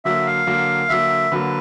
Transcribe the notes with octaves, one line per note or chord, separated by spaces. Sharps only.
D3 F#3 A#3 E5
F5
D3 F#3 A#3
D3 F#3 A#3 E5
D3 F#3 A#3 B4